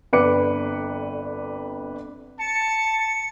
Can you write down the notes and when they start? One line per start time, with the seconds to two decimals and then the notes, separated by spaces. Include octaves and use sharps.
0.13 G1 F2 B4 D5 D6 C#7
2.39 A5 C#7